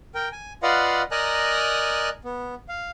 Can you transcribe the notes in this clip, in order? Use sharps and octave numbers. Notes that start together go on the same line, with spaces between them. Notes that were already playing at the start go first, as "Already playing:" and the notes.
A#4 G5
G#5
F4 B4 D5 D#5 F5 F#5
A#4 D5 D#5 G#5 A#5 F#6
B3
F5